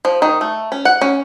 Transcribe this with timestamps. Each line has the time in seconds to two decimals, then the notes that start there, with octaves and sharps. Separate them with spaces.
0.05 F3
0.22 D#3
0.41 A3
0.72 C#4
0.85 F#5
1.01 C#4